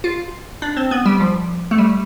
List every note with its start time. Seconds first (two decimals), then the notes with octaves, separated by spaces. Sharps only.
0.04 F4
0.62 D4
0.77 C4
0.91 B3
1.06 G3
1.20 F3
1.71 A3
1.78 G3